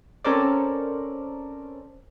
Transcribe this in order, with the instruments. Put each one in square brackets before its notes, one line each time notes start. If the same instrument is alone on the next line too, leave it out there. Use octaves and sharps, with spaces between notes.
[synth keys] C4 C#4 A4 A#4 C5 D5